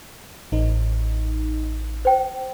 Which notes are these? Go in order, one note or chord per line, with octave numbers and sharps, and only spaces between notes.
A1 D#4
C5 G5